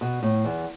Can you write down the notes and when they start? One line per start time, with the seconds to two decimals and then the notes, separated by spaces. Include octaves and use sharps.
0.01 B2
0.23 A2
0.45 E2